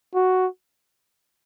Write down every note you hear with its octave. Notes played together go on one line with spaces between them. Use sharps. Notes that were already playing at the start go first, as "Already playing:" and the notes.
F#4